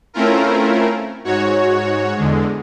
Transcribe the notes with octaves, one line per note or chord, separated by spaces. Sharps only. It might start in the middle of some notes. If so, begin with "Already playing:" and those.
A3 C4 C#4 E4 F4 A#4
G#2 F#4 C#5
E2 D3 G#3